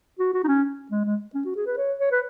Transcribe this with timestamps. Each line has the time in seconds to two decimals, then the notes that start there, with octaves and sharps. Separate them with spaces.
0.19 F#4
0.34 F#4
0.44 D#4
0.48 C#4
0.91 G#3
1.05 G#3
1.34 C#4
1.45 F#4
1.56 G#4
1.66 B4
1.77 C#5
1.99 C#5
2.12 B4